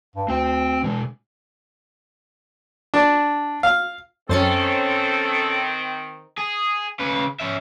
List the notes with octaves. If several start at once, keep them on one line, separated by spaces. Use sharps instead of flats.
G2
D2 C4 G5
B2 G#3
D4
F5
F#2 D#3 C4 C#4 A4 C5 A6 C#7
G#4
C#3 B4
C#4 E5